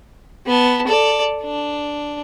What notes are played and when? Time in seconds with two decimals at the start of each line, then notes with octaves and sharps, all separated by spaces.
0.47 B3 A5
0.88 A4 D5
1.42 D4